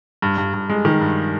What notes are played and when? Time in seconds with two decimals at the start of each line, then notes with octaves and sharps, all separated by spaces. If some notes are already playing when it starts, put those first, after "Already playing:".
0.22 G2
0.38 G2
0.54 G2
0.69 G#3
0.85 D#3
1.01 G2